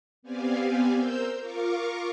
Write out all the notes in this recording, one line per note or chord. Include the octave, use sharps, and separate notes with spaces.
B3 C4 G4 D5 F5 G#5
A#4 C5 E6 G6
F4 A#4 F5 C#6 D6